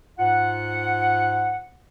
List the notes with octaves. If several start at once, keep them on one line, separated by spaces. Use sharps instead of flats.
G#2 F4 F#5